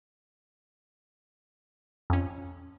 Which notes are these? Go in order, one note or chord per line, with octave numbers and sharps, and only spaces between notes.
F2 C#4